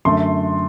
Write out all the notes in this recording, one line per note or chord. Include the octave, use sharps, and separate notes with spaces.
F#2 D3 A3 C6